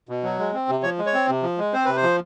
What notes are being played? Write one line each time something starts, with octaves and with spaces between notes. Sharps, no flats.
B2
F#3
G#3
C4
C3
F3 C#5
G#3
C#5
C4
C3
F3
G#3
C4 C5
C3 B4
C5
F3